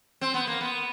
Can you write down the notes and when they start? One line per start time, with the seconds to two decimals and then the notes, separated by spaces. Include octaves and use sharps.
0.21 C4
0.34 B3
0.47 A#3
0.61 B3